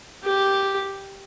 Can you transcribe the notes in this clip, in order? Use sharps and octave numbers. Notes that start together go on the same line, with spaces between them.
G4